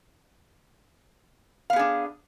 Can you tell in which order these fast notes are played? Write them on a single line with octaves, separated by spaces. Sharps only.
F5 B3 G#4 D4